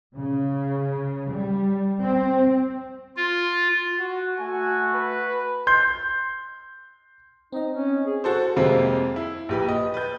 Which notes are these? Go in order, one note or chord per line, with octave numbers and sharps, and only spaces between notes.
C#3
G3
C4
F4
F#4
A3 F#4 G#5
B4
C6 G6
C4 D#4 D#5
C#4
G#4
F#4 A4 C5
F2 C3 G#3 A#3 C4
E4
A#1 G4 B4
D#5
B4 G6